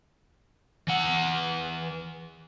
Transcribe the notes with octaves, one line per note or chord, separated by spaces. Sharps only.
E3 F#5